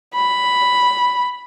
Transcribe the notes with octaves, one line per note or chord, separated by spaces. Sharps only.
B5